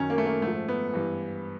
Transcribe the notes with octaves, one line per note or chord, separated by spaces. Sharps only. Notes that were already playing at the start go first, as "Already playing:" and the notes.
Already playing: F#2 D#3 C#4
A#3
A3
A#3
G#2 F3 A3
B3
G2 E3